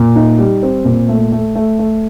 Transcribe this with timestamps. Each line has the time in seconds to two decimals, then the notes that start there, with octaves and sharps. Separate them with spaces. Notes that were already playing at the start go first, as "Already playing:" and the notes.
Already playing: A#2
0.16 D#4
0.38 G3
0.63 C4
0.85 A#2
1.08 A3
1.32 A3
1.55 A3
1.79 A3